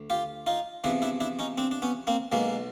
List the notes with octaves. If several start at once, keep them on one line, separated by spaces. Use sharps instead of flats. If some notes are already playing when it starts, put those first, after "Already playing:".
Already playing: D2
F4 G4
D#4 F4
E2 C3 F3 D4 E4
D4 E4
D4 E4
C#4 D#4
C4 D4
D4
B3 C#4
A#3 C4
B1 B2 G#3 A#3